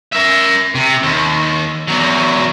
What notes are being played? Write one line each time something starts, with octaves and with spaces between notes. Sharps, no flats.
A#4 E5
C3
D#2
E2 F#3